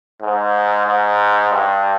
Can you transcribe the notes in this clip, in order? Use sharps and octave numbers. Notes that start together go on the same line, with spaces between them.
G#2
G#2
G2